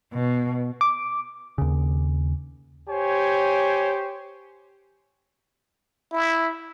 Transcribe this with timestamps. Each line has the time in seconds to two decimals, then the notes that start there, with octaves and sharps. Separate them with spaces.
0.11 B2
0.81 D6
1.58 D#2 C#3
2.89 G4 C5 C#5 G#5
6.13 E4